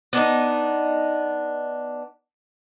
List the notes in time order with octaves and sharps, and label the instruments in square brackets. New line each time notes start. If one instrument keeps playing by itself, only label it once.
[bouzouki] B3 D4 D#4